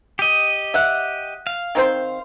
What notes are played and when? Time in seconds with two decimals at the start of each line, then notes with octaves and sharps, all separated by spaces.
0.19 G4 D#5
0.74 E5 F#5
1.47 F5
1.75 D#3 C4 C5